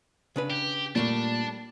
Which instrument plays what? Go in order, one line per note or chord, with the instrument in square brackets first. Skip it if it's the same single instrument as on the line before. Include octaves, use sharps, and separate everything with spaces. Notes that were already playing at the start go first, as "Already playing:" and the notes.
[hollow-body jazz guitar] C#3 D4 B4
[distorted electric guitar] G4
[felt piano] A#2 [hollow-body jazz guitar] G3 A3 A#3 [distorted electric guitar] D4